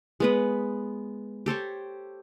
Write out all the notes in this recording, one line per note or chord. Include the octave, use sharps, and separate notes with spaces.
G#3 B3 B4
G4 A4 C5 C#5